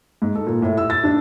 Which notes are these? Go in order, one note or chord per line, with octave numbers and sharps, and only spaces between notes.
G#2
A4
A#2
A2
E6
A6
D4